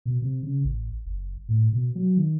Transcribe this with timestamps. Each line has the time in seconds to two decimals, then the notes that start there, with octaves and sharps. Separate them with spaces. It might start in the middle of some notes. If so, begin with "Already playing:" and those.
0.06 B2
0.22 C3
0.43 C#3
0.64 A1
1.06 F#1
1.49 A2
1.73 B2
1.95 F#3
2.17 D#3